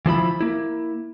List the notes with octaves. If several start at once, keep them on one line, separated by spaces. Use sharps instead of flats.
E3 F3 E4 B5
A#3 E4